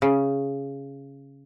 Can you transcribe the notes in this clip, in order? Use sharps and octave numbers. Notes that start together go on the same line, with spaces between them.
C#3